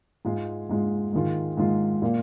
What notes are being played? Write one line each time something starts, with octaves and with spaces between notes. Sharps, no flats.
G#2 G#3 F4
G#2 G#3 F4
G#2 D#3 G#3 F4
G#2 D#3 G#3 F4
A#2 A#3 F4